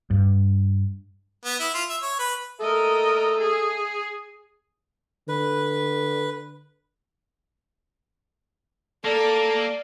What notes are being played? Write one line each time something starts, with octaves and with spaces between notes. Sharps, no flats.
G2
B3
E4
F4
E5
C#5
B4
A4 A#4 D#5 E5
G#4
D3 B4
A#3 A4 A#4 D5